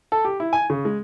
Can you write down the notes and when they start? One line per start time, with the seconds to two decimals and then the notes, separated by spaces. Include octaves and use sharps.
0.12 A4
0.25 G4
0.40 E4
0.53 G#5
0.70 C#3
0.85 G#3